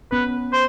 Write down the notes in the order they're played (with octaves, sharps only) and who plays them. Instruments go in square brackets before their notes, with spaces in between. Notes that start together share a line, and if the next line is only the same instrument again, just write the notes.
[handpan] B3 C#4 [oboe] B4
[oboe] C5